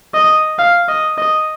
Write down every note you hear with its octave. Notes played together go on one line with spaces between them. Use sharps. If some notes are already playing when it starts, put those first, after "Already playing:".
D#5
F5
D#5
D#5